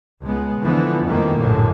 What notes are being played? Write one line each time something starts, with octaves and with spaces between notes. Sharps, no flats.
C#2 G#3 B3
D3 E3 F3 B3
F2 D#3 E3 G3 A3 A#3
A#1 F#2 A2 D3 G#3